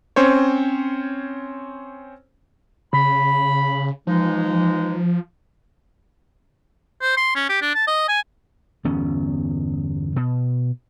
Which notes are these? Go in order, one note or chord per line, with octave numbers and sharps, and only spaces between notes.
C4 C#4 C5 C#5
C#3 B5
E3 F3 G#3 D#4
C5
C6
C#4
G4
D4
A5
D#5
G#5
G1 E2 B3 C#4
B2